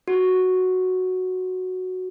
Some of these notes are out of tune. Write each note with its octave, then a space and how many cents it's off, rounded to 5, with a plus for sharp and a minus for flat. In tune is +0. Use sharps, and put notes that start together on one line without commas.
F#4 +0